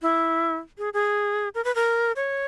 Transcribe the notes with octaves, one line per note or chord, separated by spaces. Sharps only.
E4
G#4
G#4
A#4
B4
A#4
C#5